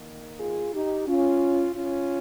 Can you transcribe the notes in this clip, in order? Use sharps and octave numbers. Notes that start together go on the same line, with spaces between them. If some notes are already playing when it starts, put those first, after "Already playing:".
Already playing: D#3 A#3
F4 G#4
D#4 G4
C#4 F4
C#4 F4